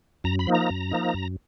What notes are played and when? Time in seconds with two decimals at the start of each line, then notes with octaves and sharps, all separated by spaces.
0.24 F#2 A#5
0.39 B5
0.47 F3 A#3 D#4
0.54 A#5
0.70 F#2
0.91 F3 A#3 D#4
1.14 F#2